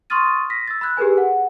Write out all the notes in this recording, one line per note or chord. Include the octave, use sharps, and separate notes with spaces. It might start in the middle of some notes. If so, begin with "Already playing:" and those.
C6 C#6 D#6 F6 A6 D#7
A#6 B6
E6 A6
B5 E6 F#6 G#6
G4 G#4 A#4 B4 G#5
F#5